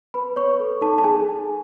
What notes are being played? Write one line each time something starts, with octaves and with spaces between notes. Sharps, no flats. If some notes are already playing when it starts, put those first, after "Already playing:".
B4 B5
B4 C#5 C#6
A4
D#4 A4 A5
A5
D#4 G#4 G#5